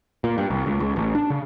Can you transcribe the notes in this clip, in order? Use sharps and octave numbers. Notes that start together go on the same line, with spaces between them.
A#2
G2
C2
C#2
C#2
A1
D4
C#3